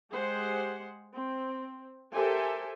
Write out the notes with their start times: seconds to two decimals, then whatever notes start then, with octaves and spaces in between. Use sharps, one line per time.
0.11 G#3 G4 G#4 C5 F#5
1.15 C4
2.14 G4 A4 A#4 C5 E5 G#5